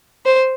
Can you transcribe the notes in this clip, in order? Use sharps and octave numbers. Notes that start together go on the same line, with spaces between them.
C5